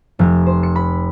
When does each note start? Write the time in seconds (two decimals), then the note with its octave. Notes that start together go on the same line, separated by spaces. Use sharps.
0.19 F1
0.46 C5
0.63 C#7
0.76 B5